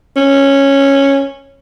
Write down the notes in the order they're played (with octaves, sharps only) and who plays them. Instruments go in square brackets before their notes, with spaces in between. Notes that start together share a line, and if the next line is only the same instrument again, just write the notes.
[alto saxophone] C#4